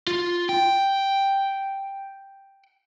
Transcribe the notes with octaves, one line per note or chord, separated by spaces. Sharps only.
F4
G5